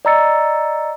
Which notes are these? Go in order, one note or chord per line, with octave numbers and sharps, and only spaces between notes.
D5 D#5 A#5 E6 A6 C#7